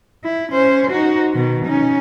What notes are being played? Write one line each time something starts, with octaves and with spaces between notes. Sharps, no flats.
E4
C#4 C5
D#4 F#4
B2 D#3
C#4 D#4